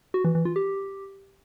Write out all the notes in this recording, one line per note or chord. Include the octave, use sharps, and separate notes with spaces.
F#4
E3
E3
F4
G4